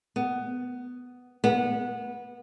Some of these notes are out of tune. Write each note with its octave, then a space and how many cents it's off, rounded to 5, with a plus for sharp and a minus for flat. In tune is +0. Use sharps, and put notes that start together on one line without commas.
B3 +10
B3 -20